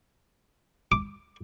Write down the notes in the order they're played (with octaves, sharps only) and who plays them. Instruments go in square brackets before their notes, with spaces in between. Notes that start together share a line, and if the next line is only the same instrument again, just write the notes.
[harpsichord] D6